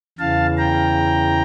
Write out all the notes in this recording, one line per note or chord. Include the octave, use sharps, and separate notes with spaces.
E2 C#3 E3 F5 A5
G5 A#5